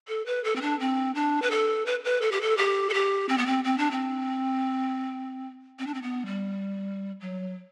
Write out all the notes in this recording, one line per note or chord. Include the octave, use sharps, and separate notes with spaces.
A4
B4
A4
C4
D4
C4
D4
B4
A4
B4
B4
A4
G4
A4
G4
A4
G4
C4
B3
C4
C4
D4
C4
C4
D4
C4
B3
G3
F#3